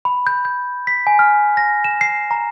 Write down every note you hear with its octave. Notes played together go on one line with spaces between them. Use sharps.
B5
G6
G6
B6
G#5
F6
A#6
E7
C7
A#5